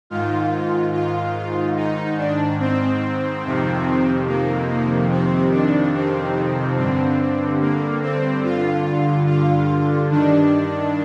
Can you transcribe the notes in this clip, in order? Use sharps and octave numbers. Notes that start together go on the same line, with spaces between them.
G#2 D#3 F4
F4
D#4
D4
C4
F2 C3 D#3
A#3
A#3
C4
D4
C4
G2 D3 C4
A#3
C4
F4
F4
G2 D#3 D4